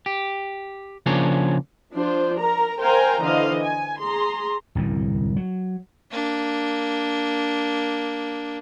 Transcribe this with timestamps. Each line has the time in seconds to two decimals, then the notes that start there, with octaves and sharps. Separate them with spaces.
0.06 G4
1.06 C#3 F3 A#3 D4 G#4 C#5
1.92 F3 D4 F4 C5
2.38 A#4 A#5
2.79 A#4 C5 F5 G5 G#5 A#5
3.20 D3 E3 C5 D#5 F5
3.62 G#5
4.00 G#4 A#5 C6
4.75 D1 C2 F#2 E3
5.37 F#3
6.11 A#3 D4